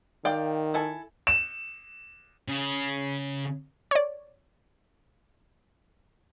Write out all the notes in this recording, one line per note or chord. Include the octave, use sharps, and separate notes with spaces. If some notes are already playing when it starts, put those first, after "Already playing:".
D#3 D5 F5 G5
E4 A4 G#5
E7
C#3
C#5 D5